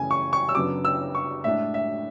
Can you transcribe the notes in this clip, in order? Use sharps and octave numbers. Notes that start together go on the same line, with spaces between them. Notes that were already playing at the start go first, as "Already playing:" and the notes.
Already playing: F#2 C#3 E3 A3 C#4 G#5
C#6
C#6
E6
F#2 C#3 F#3 B3 D4 D6
E6
C#6
A2 G#3 D4 E5
E5